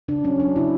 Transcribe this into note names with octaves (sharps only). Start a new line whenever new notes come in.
C#3 D4
F#3 C#4
F#3 D4
C#3 E4